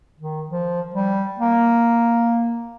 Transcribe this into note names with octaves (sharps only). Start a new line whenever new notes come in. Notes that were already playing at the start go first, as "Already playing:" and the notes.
D#3
F3
G3
A#3